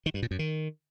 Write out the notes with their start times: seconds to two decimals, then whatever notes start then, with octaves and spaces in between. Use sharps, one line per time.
0.06 D#3
0.14 G2
0.22 A#2
0.31 F#2
0.39 D#3